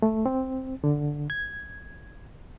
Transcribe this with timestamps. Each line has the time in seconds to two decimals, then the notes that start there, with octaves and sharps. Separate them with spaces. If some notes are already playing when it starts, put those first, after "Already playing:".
0.02 A3
0.26 C4
0.84 D3
1.30 G#6